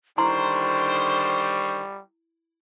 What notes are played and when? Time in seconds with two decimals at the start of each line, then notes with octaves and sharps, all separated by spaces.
0.18 D3 D#3 G3 E4 C5 A#5 C6 C#6